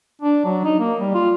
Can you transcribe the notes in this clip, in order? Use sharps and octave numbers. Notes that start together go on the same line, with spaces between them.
D4
F#3
D#4
A#3
G3
F4